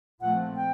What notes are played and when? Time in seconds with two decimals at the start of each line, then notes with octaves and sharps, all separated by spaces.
0.21 A#2 F3 A3 C4 F#5
0.56 G5